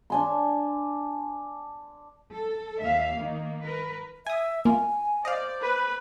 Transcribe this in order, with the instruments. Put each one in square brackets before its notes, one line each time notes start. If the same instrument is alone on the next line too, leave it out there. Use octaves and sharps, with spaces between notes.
[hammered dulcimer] D4 G#5 C6
[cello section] A4
D#2 E5 F5
D#3 A#3
A#4 B4
[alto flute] E5 [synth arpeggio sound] G#5 D#6
[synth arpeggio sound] A#3 F4 [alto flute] G#5
[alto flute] C5 [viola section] D5 [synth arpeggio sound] D#5 F5
[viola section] B4